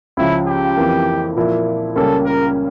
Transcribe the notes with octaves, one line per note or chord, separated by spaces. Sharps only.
C#2 C#3 F3 C#4 E4
G4
F2 E3 A#3
A#2 F3 A#3 E4
C#2 C#3 G3 A#3 C#4 A4
A#4